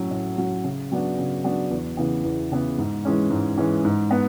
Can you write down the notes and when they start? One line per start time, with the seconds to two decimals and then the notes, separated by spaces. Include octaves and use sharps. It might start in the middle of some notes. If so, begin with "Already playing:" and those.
Already playing: A2 F#3 C#4 F#4
0.11 A2
0.38 F#3 C#4 F#4
0.64 C#3
0.92 F#3 B3 D4 F#4
1.18 C#3
1.44 F#3 B3 D4 F#4
1.71 E2
1.97 C#3 E3 B3
2.24 E2
2.51 C#3 E3 B3
2.78 G#2
3.05 E3 G#3 C#4
3.30 G#2
3.58 E3 G#3 C#4
3.85 G#2
4.11 B3